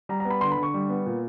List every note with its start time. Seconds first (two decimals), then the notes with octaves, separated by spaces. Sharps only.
0.09 G3 A#5
0.20 A#5
0.25 B3
0.30 B5
0.41 D3 C6
0.52 B5
0.57 D3
0.63 C#6
0.74 G3
0.89 B3
1.06 A#2